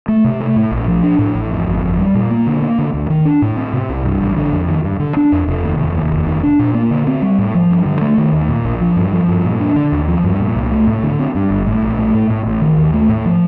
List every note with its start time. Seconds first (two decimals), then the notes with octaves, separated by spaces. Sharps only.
0.08 A3
0.24 C3
0.40 A3
0.56 A2
0.71 A#1
0.88 F3
1.03 D4
1.19 A2
1.35 A1
1.51 F2
1.67 G1
1.83 F2
1.99 G3
2.15 A#2
2.30 A#3
2.47 D3
2.62 A#3
2.78 D3
2.94 D2
3.10 D#3
3.25 D4
3.42 A2
3.57 C4
3.73 C3
3.89 C2
4.05 G2
4.20 A1
4.37 D3
4.53 F2
4.68 D#3
4.84 G2
5.00 D3
5.17 D4
5.32 F2
5.48 F1
5.64 D#2
5.79 F1
5.95 D#2
6.12 F1
6.27 D#3
6.43 D4
6.59 A#2
6.74 A#3
6.91 D3
7.07 C4
7.22 G3
7.38 A2
7.55 F3
7.70 G2
7.86 D3
8.01 A3
8.18 D#3
8.33 D#2
8.49 A#2
8.65 A#1
8.81 F3
8.96 G2
9.13 F3
9.29 G2
9.45 A#2
9.61 D4
9.76 D3
9.92 D#2
10.08 F3
10.24 G2
10.40 A#2
10.56 C2
10.72 A3
10.87 A2
11.03 D3
11.19 C4
11.35 G2
11.51 G1
11.66 A2
11.83 A#1
11.99 A3
12.14 A2
12.30 A2
12.46 A1
12.62 D#3
12.78 D#2
12.94 A3
13.09 A2
13.26 F3